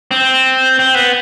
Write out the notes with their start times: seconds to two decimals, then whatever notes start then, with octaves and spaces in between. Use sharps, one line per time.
0.11 C4
0.79 C4
0.95 B3